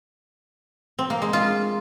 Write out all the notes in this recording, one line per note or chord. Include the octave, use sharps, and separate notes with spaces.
C4
A#3
G#3
F4